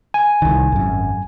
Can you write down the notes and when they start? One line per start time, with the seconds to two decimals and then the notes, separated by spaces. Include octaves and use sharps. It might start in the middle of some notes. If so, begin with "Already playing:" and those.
0.14 G#5
0.42 C2 D#3
0.72 G#1 F#2